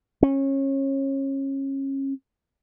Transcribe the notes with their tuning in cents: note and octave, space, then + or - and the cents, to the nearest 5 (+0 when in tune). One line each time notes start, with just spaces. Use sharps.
C#4 -25